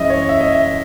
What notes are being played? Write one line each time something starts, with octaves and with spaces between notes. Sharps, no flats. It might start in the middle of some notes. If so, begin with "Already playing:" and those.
Already playing: F#2 E3 G#3 C#4 D#5 E5
C#5
E5
D#5
E5